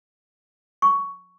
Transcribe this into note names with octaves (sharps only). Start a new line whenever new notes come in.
C#6